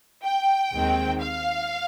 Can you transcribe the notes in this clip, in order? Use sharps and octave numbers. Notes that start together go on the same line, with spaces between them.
G5
D#2 D#3 G#3 C4
F5